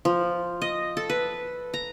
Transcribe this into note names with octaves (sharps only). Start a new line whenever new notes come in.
F3
D#5
A4
B4
A#5